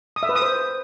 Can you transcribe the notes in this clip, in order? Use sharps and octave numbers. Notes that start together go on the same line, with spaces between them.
D#6
E5
B4
D#6
C5